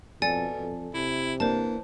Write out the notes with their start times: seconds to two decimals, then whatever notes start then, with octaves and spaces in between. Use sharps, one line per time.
0.22 F2 B2 A4 D5 G#5 A6
0.59 F2
0.94 C3 E4
1.40 E3 A#3 D4 C5 A5